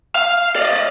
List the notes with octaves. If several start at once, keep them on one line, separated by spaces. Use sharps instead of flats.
F5
D5 D#5